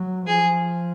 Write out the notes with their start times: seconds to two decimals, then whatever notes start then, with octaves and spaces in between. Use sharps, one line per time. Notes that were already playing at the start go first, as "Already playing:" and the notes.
Already playing: F#3
0.26 F3 G#4